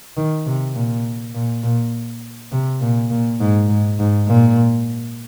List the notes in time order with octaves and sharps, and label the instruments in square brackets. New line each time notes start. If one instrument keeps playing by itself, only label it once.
[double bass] D#3
C3
A#2
A#2
A#2
C3
A#2
A#2
G#2
G#2
G#2
A#2